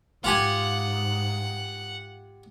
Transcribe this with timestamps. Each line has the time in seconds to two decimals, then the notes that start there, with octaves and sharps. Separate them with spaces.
0.24 G#2 F4 G4 F#5 G#5